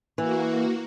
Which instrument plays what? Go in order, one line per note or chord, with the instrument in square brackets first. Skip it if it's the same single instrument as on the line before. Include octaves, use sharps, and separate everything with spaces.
[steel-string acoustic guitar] E3 [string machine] A#3 F#4